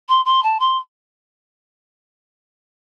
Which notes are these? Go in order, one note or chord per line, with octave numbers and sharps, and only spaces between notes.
C6
C6
A5
C6